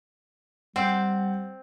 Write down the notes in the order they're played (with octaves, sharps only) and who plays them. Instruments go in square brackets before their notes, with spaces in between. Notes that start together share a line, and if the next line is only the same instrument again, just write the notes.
[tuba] G3 [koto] C4 D5 [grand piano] F#5 G5